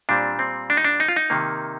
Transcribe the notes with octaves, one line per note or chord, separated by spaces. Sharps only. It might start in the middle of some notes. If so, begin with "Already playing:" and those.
A#2 G3 C4 D4
C4
D4
D#4
D4
D#4
F4
D#4
C3 D#3 A#3